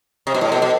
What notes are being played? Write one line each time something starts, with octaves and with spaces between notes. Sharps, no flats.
C3
B2
A2
B2
B2